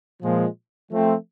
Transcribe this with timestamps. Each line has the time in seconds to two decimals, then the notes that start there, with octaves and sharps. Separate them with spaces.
0.22 A#2 F3 G#3
0.92 F3 A3 C4